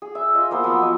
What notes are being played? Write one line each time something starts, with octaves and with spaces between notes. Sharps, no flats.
G#4
E5
F4 D#5
A#3 B3 C5
F3 F#3 B3 E6
D#5